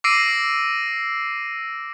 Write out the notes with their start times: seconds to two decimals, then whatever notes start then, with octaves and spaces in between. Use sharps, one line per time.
0.04 D6 E6 A#6 C7 D7 D#7